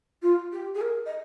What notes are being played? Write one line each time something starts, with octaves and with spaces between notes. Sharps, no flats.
F4
G4
G#4
A#4
D#5